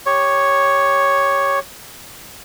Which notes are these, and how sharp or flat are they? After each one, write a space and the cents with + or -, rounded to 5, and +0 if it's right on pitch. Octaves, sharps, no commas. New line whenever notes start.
G4 +10 C#5 +0